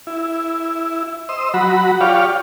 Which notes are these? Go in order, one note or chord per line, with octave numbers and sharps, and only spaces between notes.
E4
C5 D#5 E6
F#3 F#4 B5
F4 G4 C#5 D5 F5